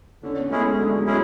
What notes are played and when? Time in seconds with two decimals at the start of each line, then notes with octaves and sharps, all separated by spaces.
0.23 D3 C#4
0.37 B3
0.50 G#3 A3 C#4 E4 G#4
0.64 G#3
0.79 D3 F#3
0.97 F#3
1.07 G#3 C#4 E4 G#4